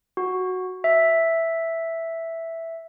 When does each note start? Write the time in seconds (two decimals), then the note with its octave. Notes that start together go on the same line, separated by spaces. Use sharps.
0.17 F#4
0.84 E5